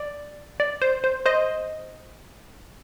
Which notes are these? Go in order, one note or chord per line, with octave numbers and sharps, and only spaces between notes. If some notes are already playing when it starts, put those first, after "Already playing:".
Already playing: D5
D5
C5
C5
C5 D#5